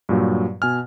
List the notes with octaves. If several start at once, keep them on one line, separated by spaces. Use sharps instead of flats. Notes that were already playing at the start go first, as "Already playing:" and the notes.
G2 A#2 F#3
B2 G#5 F6